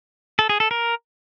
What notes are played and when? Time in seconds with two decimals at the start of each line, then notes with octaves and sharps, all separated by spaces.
0.39 A4
0.49 G#4
0.60 A4
0.71 A#4